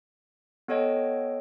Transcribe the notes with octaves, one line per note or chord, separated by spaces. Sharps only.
B3 A4 C#5 D#5 G5